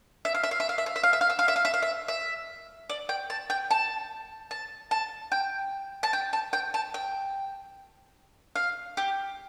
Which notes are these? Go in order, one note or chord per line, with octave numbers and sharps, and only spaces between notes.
E5
F5
E5
F5
E5
F5
E5
F5
E5
F5
E5
F5
E5
F5
E5
F5
E5
F5
E5
E5
D5
G5
A5
G5
A5
A5
A5
G5
A5
G5
A5
G5
A5
G5
F5
G4